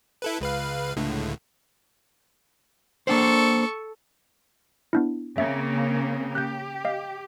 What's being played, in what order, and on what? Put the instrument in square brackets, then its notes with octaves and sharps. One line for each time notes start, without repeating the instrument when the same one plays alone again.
[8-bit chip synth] E4 A4 B4
C#2 B4 F5
C#2 A2 D3
[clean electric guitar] A#3 D4 C5 [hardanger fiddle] A4 C#6
[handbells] B3 D4 E4
[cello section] C#3 A#3 C4 [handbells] E5 C#6
[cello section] G4 [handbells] F#6 G6
[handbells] D#5 F5